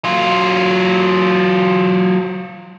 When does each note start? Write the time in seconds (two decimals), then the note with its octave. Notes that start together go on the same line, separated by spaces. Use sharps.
0.04 F#3 F4